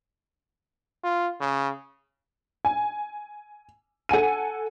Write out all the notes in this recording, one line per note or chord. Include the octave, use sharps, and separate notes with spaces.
F4
C#3
G#5
A4 F#5 G#5 D#7